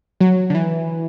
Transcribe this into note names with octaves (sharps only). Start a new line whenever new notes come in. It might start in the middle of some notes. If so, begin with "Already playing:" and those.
F#3
D3
E3